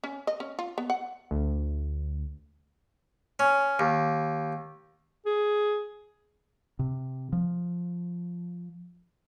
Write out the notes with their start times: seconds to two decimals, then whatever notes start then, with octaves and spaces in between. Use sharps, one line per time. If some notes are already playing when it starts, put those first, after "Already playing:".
0.04 C#4
0.27 D#5
0.40 C#4
0.59 F4
0.78 B3
0.90 F#5
1.31 D2
3.39 C#4
3.79 D#2
5.26 G#4
6.79 C3
7.33 F3